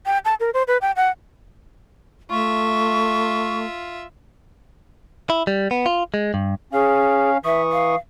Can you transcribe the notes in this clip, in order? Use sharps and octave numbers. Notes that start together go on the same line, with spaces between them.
G5
A5
A#4
C5
B4
G5
F#5
A3 F4 E5 C#6
E4
G3
B3
F4
G#3
G2
C#4 G#4 F5
E3 E5 C#6 D#6
F5